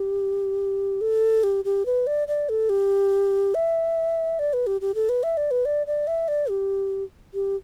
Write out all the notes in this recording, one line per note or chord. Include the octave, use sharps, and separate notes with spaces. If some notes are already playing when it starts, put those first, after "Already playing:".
Already playing: G4
A4
G4
G4
B4
D5
D5
A4
G4
E5
D5
B4
G4
G4
A4
B4
E5
D5
B4
D5
D5
E5
D5
G4
G4